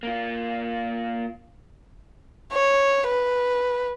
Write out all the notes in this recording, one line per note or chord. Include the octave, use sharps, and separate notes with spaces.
A#3 F4
C#5
B4